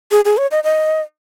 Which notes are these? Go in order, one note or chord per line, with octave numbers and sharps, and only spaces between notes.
G#4
G#4
C#5
D#5
D#5